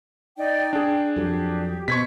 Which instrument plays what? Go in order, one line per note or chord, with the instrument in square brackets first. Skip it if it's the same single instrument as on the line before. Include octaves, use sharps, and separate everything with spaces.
[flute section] D#4 D5 G5
[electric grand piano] D4 G#4 [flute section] G5
[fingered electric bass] F2 F#3 [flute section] G4
[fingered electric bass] B2 [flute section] C5 [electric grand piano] C#6 G#6 B6